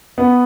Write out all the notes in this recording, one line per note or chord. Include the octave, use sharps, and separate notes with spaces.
B3